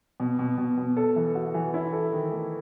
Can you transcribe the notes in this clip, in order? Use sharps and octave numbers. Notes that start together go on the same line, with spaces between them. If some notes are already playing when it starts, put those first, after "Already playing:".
B2
B2
B2
B2
A4
E3
F#4
E3
E4
A4
D#3
A3